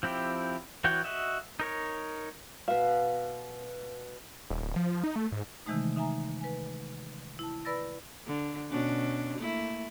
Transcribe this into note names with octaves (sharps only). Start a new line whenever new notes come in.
F3 C4 E4 G4
E3 F#4 C#5 G5
F#4 D#5 E5
D#4 A#4 C#5
B2 E5 F5
D#1
D1
F3
D#4
A3
G#2
C3 D#3 E3 G#3 A3 D#4
D#4 E5 G#5 A#5
B4 G#5
E4 A5
B4 D5 B5 E6 A6 A#6
D3
B2 C#4 D4
A3 A#3 E4